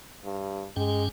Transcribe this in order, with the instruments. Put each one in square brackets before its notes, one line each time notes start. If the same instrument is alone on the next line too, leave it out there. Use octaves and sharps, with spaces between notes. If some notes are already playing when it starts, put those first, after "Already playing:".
[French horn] G2
[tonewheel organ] G2 C#4 G5 [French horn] G#3